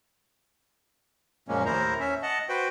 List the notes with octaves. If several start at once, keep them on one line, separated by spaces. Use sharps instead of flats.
F#2 A#2 F3 G#3 A#3 C#4
D#2 A2 E4 A#4 C5 A#5
C#4 E5
D#5 F#5 A5
F#4 B4 C5 G5